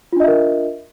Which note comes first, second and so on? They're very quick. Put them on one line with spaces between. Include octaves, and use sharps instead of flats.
F4 D4 D#5 E5 A#4